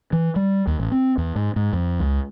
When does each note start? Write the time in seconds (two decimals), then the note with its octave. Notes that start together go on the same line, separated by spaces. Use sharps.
0.13 E3
0.36 G3
0.67 D#2
0.79 A1
0.92 C4
1.18 E2
1.36 G#2
1.56 G#2
1.73 F2
2.00 C#2